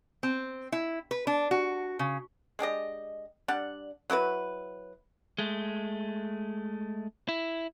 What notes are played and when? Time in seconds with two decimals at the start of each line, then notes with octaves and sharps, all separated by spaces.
0.23 C4
0.72 E4
1.11 B4
1.27 D4
1.51 F#4
1.99 C#3
2.59 G#3 D4 G4 D#5
3.48 G3 D4 D5 F#5
4.10 F#3 E4 F#4 B4
5.38 G#3 A3
7.29 E4